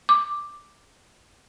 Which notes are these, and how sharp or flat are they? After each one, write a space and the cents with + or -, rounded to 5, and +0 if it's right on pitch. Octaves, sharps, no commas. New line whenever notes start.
D6 +5